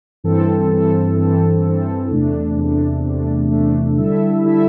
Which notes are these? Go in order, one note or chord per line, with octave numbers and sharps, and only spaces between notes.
G2 E3 C4 A4
G2 E3 C4 A4
G2 E3 C4 A4
G2 E3 C4 A4
E2 C3 A3 D4
E2 C3 A3 D4
E2 C3 A3 D4
E2 C3 A3 D4
D3 G3 E4 A4 E5
D3 G3 E4 A4 E5